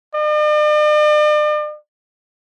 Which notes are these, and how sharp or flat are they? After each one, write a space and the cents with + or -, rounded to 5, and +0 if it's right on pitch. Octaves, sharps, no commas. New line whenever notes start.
D5 +45